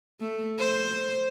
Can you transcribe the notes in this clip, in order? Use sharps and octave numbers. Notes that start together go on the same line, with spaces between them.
A3
C5